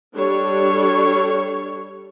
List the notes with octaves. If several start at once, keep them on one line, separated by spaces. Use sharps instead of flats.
G3 D4 A4 C#5